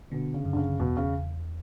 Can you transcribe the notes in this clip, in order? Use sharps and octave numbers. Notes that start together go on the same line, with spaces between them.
B2 D3
C#3
F#2
D3
C#3
E2 B2
C#3